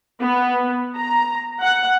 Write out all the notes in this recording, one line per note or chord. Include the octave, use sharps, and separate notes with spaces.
B3
A#5
F#5